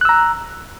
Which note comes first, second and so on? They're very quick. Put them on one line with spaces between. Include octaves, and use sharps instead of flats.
F#6 E6 A#5